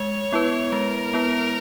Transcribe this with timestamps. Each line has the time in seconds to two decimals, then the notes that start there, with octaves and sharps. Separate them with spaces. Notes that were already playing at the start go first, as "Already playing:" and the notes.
Already playing: G#3 C#5
0.32 B3 E4 B4
0.72 G#3 A#4
1.13 B3 E4 B4